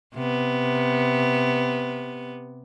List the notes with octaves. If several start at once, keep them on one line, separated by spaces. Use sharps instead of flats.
C3 B3